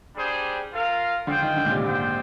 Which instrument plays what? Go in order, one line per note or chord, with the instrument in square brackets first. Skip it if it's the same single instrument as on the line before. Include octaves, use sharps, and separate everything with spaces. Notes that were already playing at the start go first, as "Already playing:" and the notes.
[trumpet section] G3 D4 G#4 C5 G5
F4 A#4 F5
[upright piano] D3 [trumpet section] F4 G#4 C5 G5
[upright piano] D#3
D3
A#2
C3
A#2
[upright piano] G#2 [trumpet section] G#3 C4 F4 C5 G5